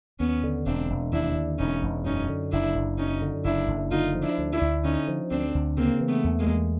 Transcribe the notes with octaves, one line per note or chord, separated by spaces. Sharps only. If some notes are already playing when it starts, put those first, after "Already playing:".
D#2 B3 C#4
D3
E1 C4 D4
E1
D#2 D4 E4
D3
E1 C#4 D#4
E1
F#2 C#4 D#4
D3
F#1 D4 E4
F#1
F#2 C#4 D#4
D3
F#1 D4 E4
F#1
D3 D#4 F4
F3
D4 E4
D2
D4 E4
D2
D3 C#4 D#4
F3
D2 C4 D4
D2
C#3 A#3 C4
E3
A3 B3
E2
G#3 A#3
E2